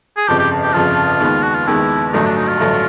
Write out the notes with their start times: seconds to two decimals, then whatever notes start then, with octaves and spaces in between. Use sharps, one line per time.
0.17 G#4
0.28 G1 F2 C#3 F3 G4
0.39 G4
0.63 G4
0.74 G1 F2 C#3 F3 F4
1.21 D#2 D#3 G#3 B3
1.43 F#4
1.55 F4
1.67 D#2 D#3 G#3 B3 E4
2.13 A1 G2 D3 F#3 A3 D#4
2.26 D4
2.36 D#4
2.48 F4
2.59 A1 G2 D3 F#3 A3